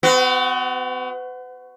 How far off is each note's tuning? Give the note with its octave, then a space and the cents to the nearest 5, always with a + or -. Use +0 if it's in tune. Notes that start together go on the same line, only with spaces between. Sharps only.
B3 +45 F#4 +0